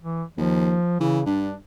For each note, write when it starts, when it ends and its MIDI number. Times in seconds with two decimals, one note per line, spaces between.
0.02 0.23 52
0.37 0.77 39
0.37 1.00 53
1.00 1.26 49
1.00 1.21 52
1.26 1.54 43
1.26 1.54 62